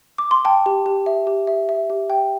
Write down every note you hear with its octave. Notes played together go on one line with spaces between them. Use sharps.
D6
C6
G5 A5
G4
G4
E5
G4
E5
E5
G4
G5